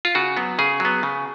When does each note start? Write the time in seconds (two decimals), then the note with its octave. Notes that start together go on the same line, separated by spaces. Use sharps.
0.05 F4
0.15 C#3 F#4
0.37 F#3 B3
0.59 C#3 G#4
0.80 F#3 B3
1.03 C#3